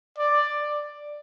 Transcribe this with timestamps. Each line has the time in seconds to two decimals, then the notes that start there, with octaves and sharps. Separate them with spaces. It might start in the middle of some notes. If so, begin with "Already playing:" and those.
0.18 D5